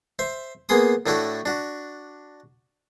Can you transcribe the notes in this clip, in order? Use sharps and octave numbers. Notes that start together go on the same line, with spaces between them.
C5 E5
A#3 B3 G#4 C6 D#6
A2 A3 D4 E4 F#4 A4
D4 F#4